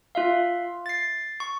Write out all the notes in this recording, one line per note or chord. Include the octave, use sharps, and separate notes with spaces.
F4 E5 F5
A6 C7
C#6